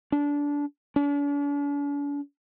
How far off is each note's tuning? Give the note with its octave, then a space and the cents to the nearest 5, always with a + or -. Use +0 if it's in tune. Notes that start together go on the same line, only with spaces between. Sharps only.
D4 -20
D4 -45